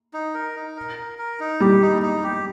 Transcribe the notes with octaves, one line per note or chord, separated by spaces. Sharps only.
D#4
A#4
D#4
A#4
A#4
A#4
D#4
G3 G4
D#4
D#4
G4